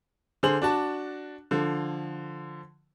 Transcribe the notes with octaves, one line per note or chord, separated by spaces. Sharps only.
D3 G#4 C5 F#7
D4 F#4 A5
D3 F3